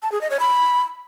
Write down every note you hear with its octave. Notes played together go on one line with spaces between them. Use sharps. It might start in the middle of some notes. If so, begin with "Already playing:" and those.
A5
G#4
D#5
C#5
B5